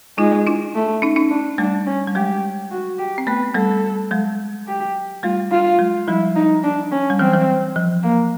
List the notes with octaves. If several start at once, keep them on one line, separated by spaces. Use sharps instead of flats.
G#3 D#4 F4
D4 E4
A3
C#4 D#4
C#4 D#4
D4
G3 A3 D4
C#4
G3
F#3 G#3 G4
F#4
G4
C4
A3 B3 B4
G3 A3 A4
F#3 G#3
G4
G3 A3 F4
F4
F#3 G#3
F3 G3 E4
D#4
D4
C#4
G3
E3 F#3 C4
E3 F#3
F3
A#3